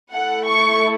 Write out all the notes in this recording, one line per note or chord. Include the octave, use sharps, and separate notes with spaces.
A3 E4 A4 F#5
C#6